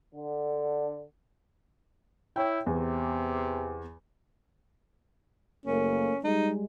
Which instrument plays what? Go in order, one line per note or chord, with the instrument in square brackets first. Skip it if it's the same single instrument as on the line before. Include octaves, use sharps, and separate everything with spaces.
[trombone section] D3
[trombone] E4 [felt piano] C#5 G5
[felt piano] E2 [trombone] C3
[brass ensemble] F#1 A3 A#3 [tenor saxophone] C#4
[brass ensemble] G3 G#3 [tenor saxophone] D#4